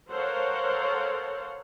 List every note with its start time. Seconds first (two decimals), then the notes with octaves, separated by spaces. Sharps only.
0.12 A4 A#4 C5 C#5 F5 F#5